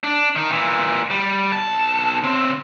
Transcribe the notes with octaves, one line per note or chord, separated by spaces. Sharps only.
D4
D#3 D#4
A#2 E3
G3
B1 A5
C#3 C4